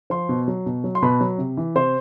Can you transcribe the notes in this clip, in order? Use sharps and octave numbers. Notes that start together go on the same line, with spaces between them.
F3 C5 C6
B2
F#3
B2
F#3
C6
B2 B4 B5
F#3
C3
E3
C3 C5 C6